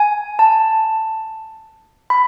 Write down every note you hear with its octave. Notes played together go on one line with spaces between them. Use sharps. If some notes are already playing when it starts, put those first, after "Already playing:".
Already playing: G#5
A5
B5